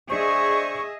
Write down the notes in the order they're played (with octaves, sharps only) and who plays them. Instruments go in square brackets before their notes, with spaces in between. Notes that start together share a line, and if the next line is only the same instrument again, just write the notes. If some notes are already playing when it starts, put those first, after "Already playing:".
[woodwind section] D4 C5 C#6 [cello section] G#4 D#5 E5